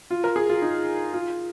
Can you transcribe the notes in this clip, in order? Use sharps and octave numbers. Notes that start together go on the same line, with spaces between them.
F4
A#4
G#4
F4
D#4
F4